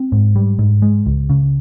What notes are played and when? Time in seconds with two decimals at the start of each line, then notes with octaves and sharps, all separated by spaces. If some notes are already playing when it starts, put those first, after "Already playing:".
Already playing: C4
0.12 G#2
0.36 G3
0.59 G#2
0.82 G#3
1.06 C#2
1.30 C#3